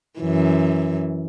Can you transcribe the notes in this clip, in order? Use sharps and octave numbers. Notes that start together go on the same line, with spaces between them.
F#2 E3